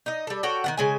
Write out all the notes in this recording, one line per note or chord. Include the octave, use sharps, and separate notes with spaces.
D#4 D#5
G3 A4
F#4 A4 C#5 G5
D#3 F3 F#5
C#3 G#3 G#5